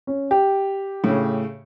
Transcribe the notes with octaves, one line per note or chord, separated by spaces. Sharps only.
C#4
G4
A2 C#3